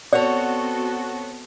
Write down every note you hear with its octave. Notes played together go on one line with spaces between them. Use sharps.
B3 C4 F#4 A4 C#5 D5 F#5